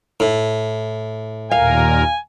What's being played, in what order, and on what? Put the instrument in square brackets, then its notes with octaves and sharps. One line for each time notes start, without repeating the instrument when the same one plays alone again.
[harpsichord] A2
[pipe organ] D#2 A#2 A#4 [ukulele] F5 [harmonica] G#5